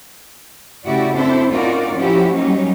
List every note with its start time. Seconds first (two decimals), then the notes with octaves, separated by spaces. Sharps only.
0.86 C#3 A3 E4 F#4 G4 D5
1.15 C4 D4 E4 A4 C5
1.51 C#4 D#4 F4 F#4 A#4 D5
1.96 F3 C#4 E4 F#4 G4
2.33 F#3 G3 A#3 C#4 D#4